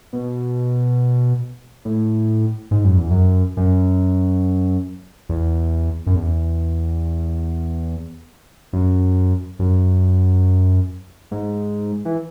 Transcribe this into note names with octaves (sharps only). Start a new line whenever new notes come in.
B2
A2
G#2
F#2
E2
F#2
F#2
E2
F#2
E2
F#2
F#2
G#2
E3